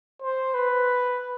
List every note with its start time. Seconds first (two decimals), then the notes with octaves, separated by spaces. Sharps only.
0.22 C5
0.54 B4